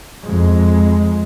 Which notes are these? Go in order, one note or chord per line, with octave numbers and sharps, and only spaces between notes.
F2 G#3